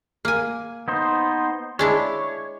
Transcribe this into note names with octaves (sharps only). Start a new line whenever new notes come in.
A#3 G#5
B3 D#4 C5
G#3 D4 E4 C#5